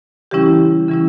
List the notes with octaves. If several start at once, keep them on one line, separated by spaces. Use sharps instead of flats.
C#3 E3 G3 C#4 E4 G4
C#3 E3 G3 C#4 E4